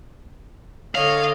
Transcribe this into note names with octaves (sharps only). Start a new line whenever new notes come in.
D3 C#5 D#5 F5